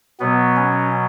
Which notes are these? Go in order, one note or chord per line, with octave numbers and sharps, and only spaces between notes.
B2 F#3 B3
C#4